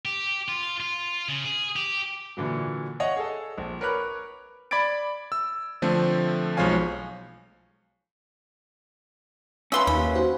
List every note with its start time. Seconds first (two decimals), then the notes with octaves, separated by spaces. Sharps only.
0.05 G4
0.48 F4
0.80 F4
1.29 C#3
1.45 G#4
1.76 G4
2.37 A#2 D3 E3 F#3
3.00 C#5 D#5 F5 F#5
3.16 G#4 A4
3.58 A#1
3.81 A#4 B4 C#5 B5 D6 F#6
4.71 D5 B5 D6 G#6 A6 D7
5.32 E6
5.82 D3 F3 A3 C4
6.57 B1 F3 G#3 C#5 F5 G#5
9.72 A3 C#4 F4 B4 C6 E6
9.87 D#2 B5
10.14 F#4 C5 G#5